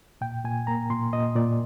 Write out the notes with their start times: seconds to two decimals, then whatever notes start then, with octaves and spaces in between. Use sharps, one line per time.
0.21 A#2 G5
0.45 A#2 G#5
0.67 A#3 A#5
0.90 A#2 C6
1.13 A#2 D#5
1.36 A#2 D5